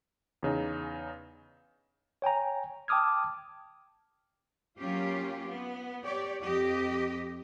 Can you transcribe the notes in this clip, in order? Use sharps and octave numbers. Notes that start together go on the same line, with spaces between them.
E2 C#3 D#4
C#5 G5 G#5 A#5
G5 A5 D6 D#6 F6 G#6
F#3 A#3 C#4 F4 G4
B3
G4 C#5 D5
F2 G4 D#5